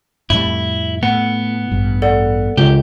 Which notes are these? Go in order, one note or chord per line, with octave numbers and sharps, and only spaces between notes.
F2 A2 G3 E4
A2 B3 F#5
A1 G2
A4 D5 F#5
C#2 G4